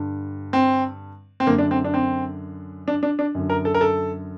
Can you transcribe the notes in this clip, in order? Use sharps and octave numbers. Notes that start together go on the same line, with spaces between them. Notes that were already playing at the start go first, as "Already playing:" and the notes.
Already playing: G2 D3
C4
C4
F#2 D3 A#3
D4
C4
D4
C4
D4
D4
D4
F#2 D3
A#4
A4
A#4
A4